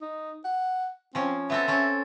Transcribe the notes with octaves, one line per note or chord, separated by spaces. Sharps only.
D#4
F#5
F3 C4 C#4
B3 C4 A4 E5
C4 C#4 A4